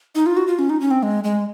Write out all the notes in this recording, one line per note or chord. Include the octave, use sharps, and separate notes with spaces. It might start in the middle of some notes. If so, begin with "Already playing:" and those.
D#4
F4
F#4
F4
C#4
D#4
C#4
C4
G#3
G#3